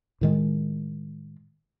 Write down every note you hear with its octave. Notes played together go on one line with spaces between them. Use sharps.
A2 D#3 G#3